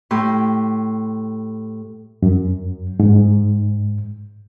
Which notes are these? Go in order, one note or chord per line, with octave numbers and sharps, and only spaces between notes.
A2 G4 C6
F#2
G#2